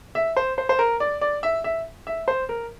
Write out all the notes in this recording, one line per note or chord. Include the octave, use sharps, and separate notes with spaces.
E5
C5
C5
C5
A#4
D5
D5
E5
E5
E5
C5
A#4